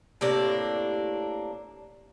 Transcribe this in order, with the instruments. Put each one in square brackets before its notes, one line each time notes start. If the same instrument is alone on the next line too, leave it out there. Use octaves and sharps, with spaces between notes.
[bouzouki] A2 C3 A#3 D4